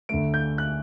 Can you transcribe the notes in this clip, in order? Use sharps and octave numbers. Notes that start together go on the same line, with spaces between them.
D2 D3 A3 D7
G6
F#6